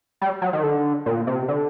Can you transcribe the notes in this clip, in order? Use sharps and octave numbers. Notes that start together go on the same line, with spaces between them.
G3
F#3
D#3
D3
A#2
C3
D3